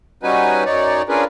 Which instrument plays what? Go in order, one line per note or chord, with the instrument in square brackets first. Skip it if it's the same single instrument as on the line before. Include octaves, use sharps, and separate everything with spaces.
[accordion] G3 C#4 D#4 F#4 B4 G#5
F#2 D#4 C#5 D5
C#4 D4 F4 G#4 A#4 B4